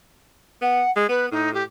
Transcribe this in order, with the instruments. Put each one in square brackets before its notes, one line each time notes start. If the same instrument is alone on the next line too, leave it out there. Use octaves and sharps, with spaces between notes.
[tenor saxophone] B3 [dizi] F#5
[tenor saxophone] G#3
[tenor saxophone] B3 [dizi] B4
[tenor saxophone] A2 [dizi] D#4
[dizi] G4